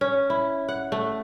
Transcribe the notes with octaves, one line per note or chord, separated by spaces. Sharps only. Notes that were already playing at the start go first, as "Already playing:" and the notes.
C#4
E4
F#5
A3